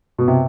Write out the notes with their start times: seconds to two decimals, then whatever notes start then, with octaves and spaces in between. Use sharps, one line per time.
0.19 B2
0.28 C3